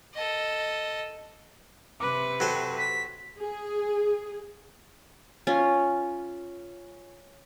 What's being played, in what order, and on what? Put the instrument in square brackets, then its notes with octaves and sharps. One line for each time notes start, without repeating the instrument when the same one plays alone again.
[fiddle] A4 D#5
[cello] C3 B4 [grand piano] D6
[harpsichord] F#3 C5 [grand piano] G4 A4
[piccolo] B6
[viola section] G#4
[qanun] C#4 F4